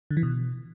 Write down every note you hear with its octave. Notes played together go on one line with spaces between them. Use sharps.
D3
E3
B2